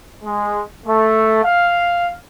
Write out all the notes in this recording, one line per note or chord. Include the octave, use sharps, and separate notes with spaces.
G#3
A3
F5